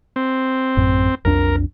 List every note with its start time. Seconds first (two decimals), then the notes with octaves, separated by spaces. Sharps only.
0.16 C4
0.77 A1 F#2
1.25 B1 F2 D4 A#4